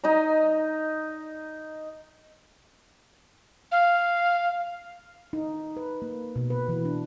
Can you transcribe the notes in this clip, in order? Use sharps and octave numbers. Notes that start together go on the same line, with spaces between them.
D#4 D#5 A#5
F5
D#4
B4
A#3
B2
B4
E3
D4